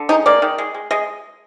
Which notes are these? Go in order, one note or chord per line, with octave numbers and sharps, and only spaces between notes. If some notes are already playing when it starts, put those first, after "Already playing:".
Already playing: D3
G#3 D#4
A#3 D5
D#3
G#3
G#3
G#3 D#5